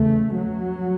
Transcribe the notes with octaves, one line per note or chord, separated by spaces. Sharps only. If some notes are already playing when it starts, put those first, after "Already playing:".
Already playing: E2 C#3 A3
F#3